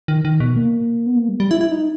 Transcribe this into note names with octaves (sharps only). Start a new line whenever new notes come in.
D#3
D#3
B2
A#3
B3
A#3
G3
G3
E4
E4
D#4